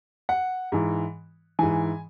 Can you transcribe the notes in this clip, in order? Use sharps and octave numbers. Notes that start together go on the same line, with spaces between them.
F#5
G#2 E3
G#2 E3 G#5